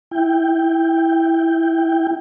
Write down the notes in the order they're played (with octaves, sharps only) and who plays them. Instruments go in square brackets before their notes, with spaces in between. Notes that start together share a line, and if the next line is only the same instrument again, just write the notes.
[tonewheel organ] E4 G5